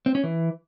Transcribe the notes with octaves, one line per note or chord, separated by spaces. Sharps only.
C4
C#4
E3